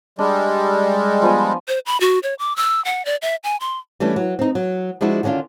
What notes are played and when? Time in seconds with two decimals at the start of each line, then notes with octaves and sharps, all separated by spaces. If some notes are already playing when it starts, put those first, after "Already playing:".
0.19 G3 G#3 D4
1.22 F3 B3 G#5
1.68 C5
1.86 B5
2.00 F#4
2.23 C#5
2.39 D6
2.56 E6
2.85 F#5
3.05 D5
3.22 E5
3.44 G#5
3.61 C6
4.00 E3 G3 A3 C#4 D4
4.16 F#3
4.39 C4 D#4
4.55 F#3
5.01 F3 G#3 D4 E4 F#4
5.23 D3 D#3 C#4 D4 F4